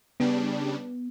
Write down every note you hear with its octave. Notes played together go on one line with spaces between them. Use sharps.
C#3 G3 B3 D4